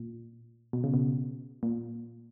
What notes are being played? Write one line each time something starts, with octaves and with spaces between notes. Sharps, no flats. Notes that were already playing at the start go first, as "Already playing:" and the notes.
Already playing: A#2
B2
C#3
B2
A#2